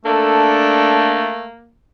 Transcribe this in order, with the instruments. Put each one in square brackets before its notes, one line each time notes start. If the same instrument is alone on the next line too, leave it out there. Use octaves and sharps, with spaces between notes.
[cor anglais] A3 [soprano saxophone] A#3 [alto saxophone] D4 [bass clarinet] A4